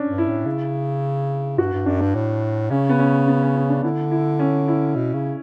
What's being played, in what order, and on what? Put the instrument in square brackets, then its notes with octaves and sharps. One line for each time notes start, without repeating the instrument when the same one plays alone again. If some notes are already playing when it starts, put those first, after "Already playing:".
Already playing: [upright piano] C#4 D4
[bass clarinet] G2
[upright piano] E4
[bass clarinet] A2
C#3
[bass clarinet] G2 [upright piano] F#4
[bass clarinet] G2
[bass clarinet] F#2 [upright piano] D4
[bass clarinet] G2
A2
[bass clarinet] C#3 [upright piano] C#4
[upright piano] B3
C#4
B3
C#4
C#4
D4
[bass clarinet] D3 [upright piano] E4
[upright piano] E4
C#4
E4
[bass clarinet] B2
C#3